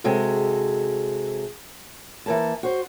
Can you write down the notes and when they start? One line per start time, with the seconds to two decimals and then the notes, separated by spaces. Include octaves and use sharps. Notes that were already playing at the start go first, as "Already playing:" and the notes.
0.04 C3 G#3 F#4 A4
2.26 E3 A#3 A5
2.63 F#4 C5